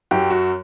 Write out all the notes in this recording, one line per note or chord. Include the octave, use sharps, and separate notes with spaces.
F#2 F#3 G4
F#4